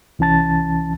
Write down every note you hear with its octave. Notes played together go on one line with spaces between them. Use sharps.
C2 E3 C#4 A5 A6